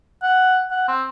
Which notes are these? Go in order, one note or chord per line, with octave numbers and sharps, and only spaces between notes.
F#5
F#5
C4